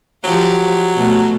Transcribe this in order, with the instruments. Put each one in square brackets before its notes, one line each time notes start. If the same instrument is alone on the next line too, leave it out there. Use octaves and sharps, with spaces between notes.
[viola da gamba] F3 G4 [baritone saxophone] F#3
[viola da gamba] B2 A3